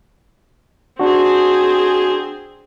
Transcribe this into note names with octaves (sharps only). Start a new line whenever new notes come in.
C4 D4 F#4 G#4